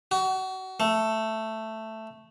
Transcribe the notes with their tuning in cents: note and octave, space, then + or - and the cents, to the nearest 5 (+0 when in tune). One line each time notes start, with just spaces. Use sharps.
F#4 +30
A3 +5